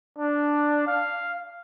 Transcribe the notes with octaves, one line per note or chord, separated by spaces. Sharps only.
D4
F5